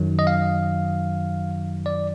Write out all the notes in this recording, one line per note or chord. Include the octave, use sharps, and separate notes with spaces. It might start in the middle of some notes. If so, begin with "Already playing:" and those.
Already playing: F#2 D#3 F#3
D#5
F5
D5